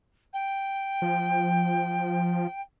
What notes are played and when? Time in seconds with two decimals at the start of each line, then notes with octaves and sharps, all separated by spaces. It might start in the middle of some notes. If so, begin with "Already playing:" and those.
0.33 G5
1.02 F3